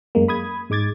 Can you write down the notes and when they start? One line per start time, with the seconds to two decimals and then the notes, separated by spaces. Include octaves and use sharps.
0.15 F#2 G#3 A#3
0.28 B5 D#6 G#6
0.70 G#2 G#3 D6 G#6 A6